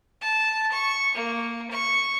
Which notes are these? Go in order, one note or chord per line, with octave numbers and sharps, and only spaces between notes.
A5
C#6
A#3
C#6